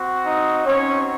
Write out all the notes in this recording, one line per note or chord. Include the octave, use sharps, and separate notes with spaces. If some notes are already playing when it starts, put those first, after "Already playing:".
Already playing: C4 F#4
D#4 D#5
C4 C#4 D#4 F#4 C#5